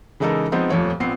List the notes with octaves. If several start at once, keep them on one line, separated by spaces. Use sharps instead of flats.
C#3 E3 G#3 D#4 A4 A#4
F3 G#3 B3 C4 D#4 C5
D#1 F2 F3 A3 C#5
A#1 B3 C4 C7